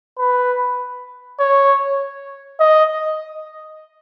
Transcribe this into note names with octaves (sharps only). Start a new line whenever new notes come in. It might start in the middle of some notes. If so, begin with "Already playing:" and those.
B4
C#5
D#5